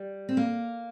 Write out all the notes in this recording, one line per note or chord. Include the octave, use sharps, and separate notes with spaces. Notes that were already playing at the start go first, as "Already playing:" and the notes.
Already playing: G3
C4
A#3